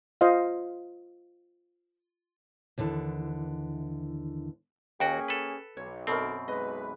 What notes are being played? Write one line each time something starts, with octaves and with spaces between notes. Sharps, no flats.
F4 C5 D#5 F5
D#2 D3 E3
D#2 A#3 C#4 F#4 G#4 G5
A4 B4
B1 C#5
F#2 B2 C4 A4 A#4
B1 G#3 B4 D#5